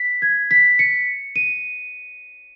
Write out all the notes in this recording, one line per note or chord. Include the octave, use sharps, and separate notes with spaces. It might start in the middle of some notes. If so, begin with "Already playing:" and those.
Already playing: B6
G#6
B6
C#7
D#7